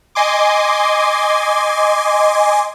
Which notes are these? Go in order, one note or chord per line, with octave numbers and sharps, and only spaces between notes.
D#5 G#5 C6 D6